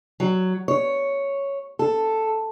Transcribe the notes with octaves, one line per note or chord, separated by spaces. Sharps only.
F#3
C#5
A4